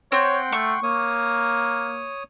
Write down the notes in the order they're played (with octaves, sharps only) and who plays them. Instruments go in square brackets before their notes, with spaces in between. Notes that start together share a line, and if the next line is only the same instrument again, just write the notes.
[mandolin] C4 [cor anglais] C#5 [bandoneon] F#5 G5 C6
[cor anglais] A3 [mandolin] C#6
[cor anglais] A#3 [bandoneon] C#5 D#6